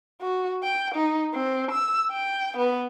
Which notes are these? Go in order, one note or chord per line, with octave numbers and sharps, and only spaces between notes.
F#4
G5
D#4
C4
E6
G5
B3